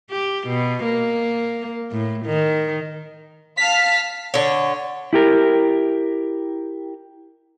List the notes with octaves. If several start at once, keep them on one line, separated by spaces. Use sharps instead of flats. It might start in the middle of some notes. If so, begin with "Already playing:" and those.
G4
B2
A#3
A2
D#3
F5 A5 F6 B6
D3 C#5
E4 G4 A#4